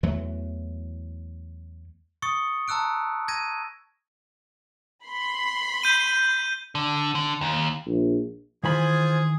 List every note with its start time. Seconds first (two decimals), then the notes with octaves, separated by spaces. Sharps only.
0.03 E2 E3 F#3 A3
2.22 C#6 D#6 A6 C#7
2.68 A5 A#5 E6 F#6 D7
3.28 G#6 A#6 D#7
5.06 B5 C6
5.82 G6 D#7 G7
6.75 D3
7.15 D3
7.41 D#2
7.87 A#1
8.64 D#3 E3 F4 G#4 C5 G#5 B5